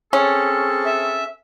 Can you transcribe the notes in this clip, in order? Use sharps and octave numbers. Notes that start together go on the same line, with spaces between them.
C4 C#4 G#4 A4
E5